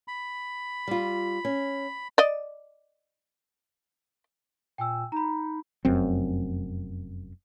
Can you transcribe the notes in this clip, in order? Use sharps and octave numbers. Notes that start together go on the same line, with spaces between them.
B5
G3 F4
C#4
D5 D#5
A#2 G5 G#5 E6
D#4 A#5 B5
F1 F#2 C4